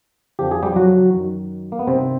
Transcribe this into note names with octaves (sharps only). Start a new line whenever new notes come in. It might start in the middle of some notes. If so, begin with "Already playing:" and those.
F2 D3 F3 G4
G#4
G3 G4
F#3 F#4
F#2 D#3
A#3
B3
G2 C3 D#3 C4